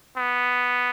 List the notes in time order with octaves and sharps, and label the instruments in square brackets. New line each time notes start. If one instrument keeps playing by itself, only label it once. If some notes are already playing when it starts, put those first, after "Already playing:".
[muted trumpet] B3